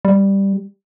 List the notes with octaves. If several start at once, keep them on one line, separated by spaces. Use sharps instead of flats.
G3